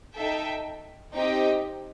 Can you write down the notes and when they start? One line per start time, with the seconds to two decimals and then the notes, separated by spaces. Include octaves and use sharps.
0.15 D#4 A4 E5 G5
1.14 C4 D#4 G4 D#5 G5